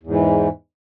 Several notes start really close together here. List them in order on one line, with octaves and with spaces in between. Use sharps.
E2 G#2 E3